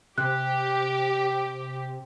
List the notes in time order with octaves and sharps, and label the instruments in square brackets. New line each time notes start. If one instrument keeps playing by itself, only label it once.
[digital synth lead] C3 [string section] G4 [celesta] F#6